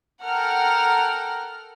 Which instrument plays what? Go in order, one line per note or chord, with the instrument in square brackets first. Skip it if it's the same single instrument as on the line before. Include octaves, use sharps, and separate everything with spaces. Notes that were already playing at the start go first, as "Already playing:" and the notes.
[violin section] A4 A#4 F#5 G5 A#5 F6